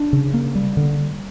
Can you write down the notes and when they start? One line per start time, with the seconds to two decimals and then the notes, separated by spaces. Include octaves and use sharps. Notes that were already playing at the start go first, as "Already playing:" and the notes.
Already playing: D4
0.13 C#3
0.34 A#3
0.55 G3
0.77 D3